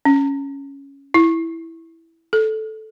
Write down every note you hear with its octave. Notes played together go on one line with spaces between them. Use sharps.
C#4
E4
A4